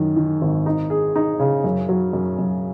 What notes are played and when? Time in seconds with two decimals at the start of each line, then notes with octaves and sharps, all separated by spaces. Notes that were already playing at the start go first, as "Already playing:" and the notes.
Already playing: F#2 D#3
0.16 D#3
0.41 G#1
0.66 D#4
0.90 G#4
1.16 D#4
1.40 C#3
1.64 F#2
1.89 F#3
2.13 F#2
2.39 F#2